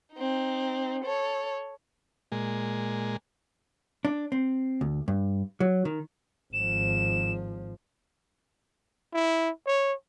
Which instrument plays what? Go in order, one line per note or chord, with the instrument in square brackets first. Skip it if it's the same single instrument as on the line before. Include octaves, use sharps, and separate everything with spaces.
[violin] C4 D#4
A4 C#5
[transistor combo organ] A#2 G#3
[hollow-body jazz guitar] D4
C4
D2
G2
F#3
D#3
[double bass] G#1 F3 [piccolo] E7
[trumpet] E4
C#5